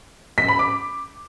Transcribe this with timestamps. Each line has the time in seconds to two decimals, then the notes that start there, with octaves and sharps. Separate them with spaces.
0.38 B6
0.48 B5
0.59 D6